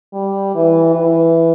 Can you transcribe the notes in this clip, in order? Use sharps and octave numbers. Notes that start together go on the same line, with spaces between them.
G3
E3
E3